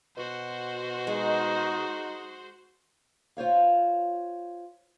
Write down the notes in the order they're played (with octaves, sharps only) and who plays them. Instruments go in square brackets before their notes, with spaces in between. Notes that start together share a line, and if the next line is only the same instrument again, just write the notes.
[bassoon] B2 [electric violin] F#4 C5
[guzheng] G#3 [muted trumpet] D#4
[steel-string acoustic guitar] F4 C5 C#5 F5